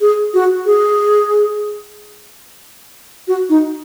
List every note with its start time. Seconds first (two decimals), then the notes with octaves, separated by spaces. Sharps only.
0.01 G#4
0.34 F#4
0.66 G#4
3.28 F#4
3.50 D#4